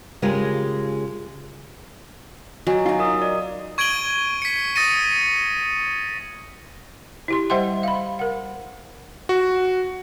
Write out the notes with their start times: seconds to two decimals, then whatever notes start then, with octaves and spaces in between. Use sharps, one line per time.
0.22 C#3 G#3 F4 G4 G#4 A#4
2.67 F#3 D#5 G#5
2.86 D#4 F4
2.99 A#4 D#5 D#6
3.22 D5
3.78 C#6 G#6 D7 D#7 F#7 G7
4.42 B6 C#7
4.76 D#6 A6 A#6 C#7 D#7
7.28 E4 G4 C6
7.50 G3 C5 E5 F#5 G5 C6
7.83 F5 B5
8.19 A#4 F#5
9.29 F#4